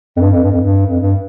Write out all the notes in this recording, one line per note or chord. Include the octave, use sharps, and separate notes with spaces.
F2
G2
F2
G2
F2
G2
F2
G2